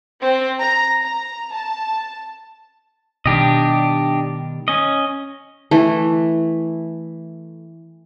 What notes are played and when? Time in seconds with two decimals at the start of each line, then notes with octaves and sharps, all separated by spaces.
0.20 C4
0.61 A#5
1.02 A#5
1.53 A5
3.26 B2 D#3 G3 D4 G4 D#5
4.68 C#4 D#5
5.71 E3 A3